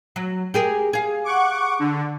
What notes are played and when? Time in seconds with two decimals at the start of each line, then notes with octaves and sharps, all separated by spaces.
0.16 F#3
0.54 G4 G#4 A#4
0.93 G#4 F5
1.24 F#5 C#6 D6
1.79 D3